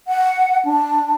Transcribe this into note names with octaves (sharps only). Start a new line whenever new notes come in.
F#5
D4